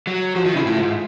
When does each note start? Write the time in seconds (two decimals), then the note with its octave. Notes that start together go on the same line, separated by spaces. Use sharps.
0.07 F#3
0.35 F3 F#4
0.45 D#3 F4
0.55 C#3 E4
0.65 A2 F4
0.79 G#2